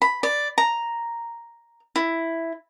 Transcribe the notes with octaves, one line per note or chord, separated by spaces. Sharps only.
B5
D5
A#5
E4